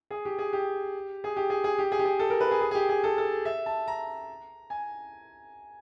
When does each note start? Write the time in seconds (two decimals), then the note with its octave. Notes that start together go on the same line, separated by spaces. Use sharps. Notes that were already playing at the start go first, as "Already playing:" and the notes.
0.11 G#4
0.25 G4
0.38 G#4
0.53 G4
1.24 G#4
1.36 G4
1.50 G#4
1.64 G#4
1.79 G4
1.92 G#4
1.99 G4
2.05 G#4
2.19 A4
2.30 A#4
2.41 B4
2.51 G#4
2.61 G#4
2.71 G#4
2.75 G4
2.89 G#4
3.04 A4
3.18 A4
3.45 E5
3.66 A5
3.88 A#5
4.70 G#5